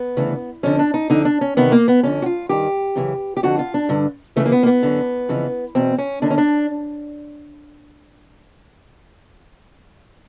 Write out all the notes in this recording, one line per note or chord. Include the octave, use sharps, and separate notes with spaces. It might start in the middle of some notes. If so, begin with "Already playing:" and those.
Already playing: B3
D2 C#3 E3
F2 D3 C#4
D4
D#4
F2 D3 D#4
D4
C#4
E2 C3 D#3 B3
A#3
B3
F2 D3 C#4
F#4
F4
G2 D#3 G4
F#2 C#3 E3
G4
F2 D3 F#4
F4
D4
G2 D3
D#2 C#3 E3 A3
A#3
B3
A#3
B3
F#2 D3
F2 C#3 E3
E2 B2 C4
C#4
D#2 D3 D4
C#4
D4